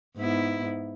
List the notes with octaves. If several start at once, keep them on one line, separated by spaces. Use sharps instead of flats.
G#2 B3 E4